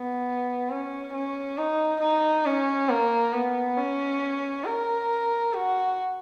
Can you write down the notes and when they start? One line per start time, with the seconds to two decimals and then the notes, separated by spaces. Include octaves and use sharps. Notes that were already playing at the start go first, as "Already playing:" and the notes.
Already playing: B3
0.70 C#4
1.13 C#4
1.58 D#4
2.01 D#4
2.46 C#4
2.89 A#3
3.33 B3
3.78 C#4
4.66 A#4
5.54 F#4